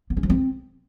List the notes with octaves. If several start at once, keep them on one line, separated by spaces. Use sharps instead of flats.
B3
C#4
F3
C4